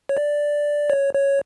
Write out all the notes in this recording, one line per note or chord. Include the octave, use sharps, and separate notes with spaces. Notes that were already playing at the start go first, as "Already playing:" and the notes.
C#5
D5
C#5
C#5